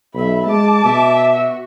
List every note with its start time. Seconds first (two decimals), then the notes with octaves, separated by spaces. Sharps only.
0.15 B1 E5 B5
0.46 G#3 A5 D6
0.85 B2 E5
1.31 F#4